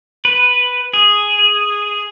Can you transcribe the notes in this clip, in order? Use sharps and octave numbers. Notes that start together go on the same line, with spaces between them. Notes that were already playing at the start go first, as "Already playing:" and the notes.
B4
G#4